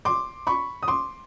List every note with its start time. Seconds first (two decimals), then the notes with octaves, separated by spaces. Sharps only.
0.05 C6 D6
0.47 B5 C#6
0.83 D#6
0.88 C6 D6